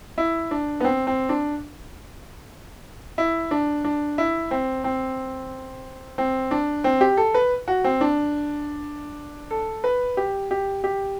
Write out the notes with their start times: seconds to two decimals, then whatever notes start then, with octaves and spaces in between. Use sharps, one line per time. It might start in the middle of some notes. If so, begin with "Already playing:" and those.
0.18 E4
0.51 D4
0.80 B3
0.84 C4
1.07 C4
1.29 D4
3.18 E4
3.51 D4
3.84 D4
4.18 E4
4.51 C4
4.84 C4
6.18 C4
6.51 D4
6.84 C4
7.01 G4
7.17 A4
7.34 B4
7.68 F#4
7.84 C4
8.01 D4
9.51 A4
9.84 B4
10.17 G4
10.51 G4
10.84 G4